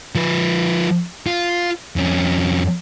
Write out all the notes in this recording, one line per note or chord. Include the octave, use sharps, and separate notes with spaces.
F3 B4
F4
F2 C#4